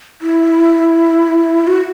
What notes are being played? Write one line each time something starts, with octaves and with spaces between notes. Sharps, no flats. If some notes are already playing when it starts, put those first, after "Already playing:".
E4
F#4